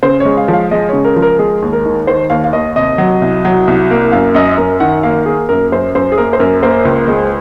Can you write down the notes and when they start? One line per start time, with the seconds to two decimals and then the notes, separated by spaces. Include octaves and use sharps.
0.03 C#3 C5
0.20 G#3 C#5
0.37 F5
0.48 F3
0.53 F5
0.71 G#3 D#5
0.89 C#3 C#5
1.05 A#4
1.16 F3
1.22 A#4
1.39 G#3 G#4
1.62 D#2
1.73 A#4
1.85 D#3
2.07 D#3 C5
2.30 D#2 F5
2.44 F5
2.53 D#2 D#5
2.76 C3 D#5
2.98 F#3
3.22 C2
3.45 F#3
3.67 C2
3.90 A#3
4.12 F#2 F5
4.35 F#2 D#5
4.58 F#2 A#4
4.80 D#3 F#5
5.03 A#3 F5
5.26 A#3 G#4
5.49 F#2 A#4
5.72 F#2 C5
5.95 F#2 C5
6.12 G#4
6.18 A#3 A#4
6.33 C5
6.39 F#2 A#4
6.63 A#3 C5
6.85 C#2
7.08 G#3